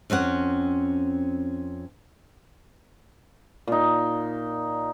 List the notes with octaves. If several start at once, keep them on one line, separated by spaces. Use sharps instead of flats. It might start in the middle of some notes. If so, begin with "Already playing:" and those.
F2 C4 C#4 F#5
A#2 D#4